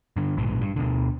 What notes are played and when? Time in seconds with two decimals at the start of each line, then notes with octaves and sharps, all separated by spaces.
0.16 G2 D3
0.37 A#1 G#2 B2
0.61 G2
0.76 D2 B2 D3